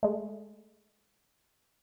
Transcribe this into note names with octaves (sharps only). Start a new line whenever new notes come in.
G#3 A3